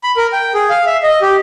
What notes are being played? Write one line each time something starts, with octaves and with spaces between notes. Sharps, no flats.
B5
A#4
G5
G#4
F5
E5
D#5
G4